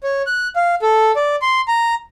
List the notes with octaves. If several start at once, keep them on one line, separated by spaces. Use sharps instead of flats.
C#5
F#6
F5
A4
D5
C6
A#5